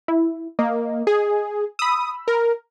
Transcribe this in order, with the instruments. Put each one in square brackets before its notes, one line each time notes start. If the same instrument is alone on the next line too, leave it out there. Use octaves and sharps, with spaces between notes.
[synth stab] E4
[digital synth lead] A#3 [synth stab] D#5
[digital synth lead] G#4
[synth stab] B5 E6 [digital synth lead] D#6
[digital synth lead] A#4